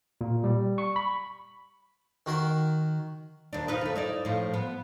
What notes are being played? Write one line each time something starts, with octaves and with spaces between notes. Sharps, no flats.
A#2
G3
C#6
B5
D#3 F#4 A#4 C6
D#2 D4
D#4 F4 B4
D#2 A3
D#4 E4 D5
A2 F3
B3